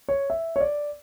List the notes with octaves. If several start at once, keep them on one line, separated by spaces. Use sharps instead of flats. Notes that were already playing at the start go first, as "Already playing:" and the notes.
C#5
E5
C#5
D5